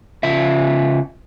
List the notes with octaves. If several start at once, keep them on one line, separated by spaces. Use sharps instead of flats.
C#3 F4 E5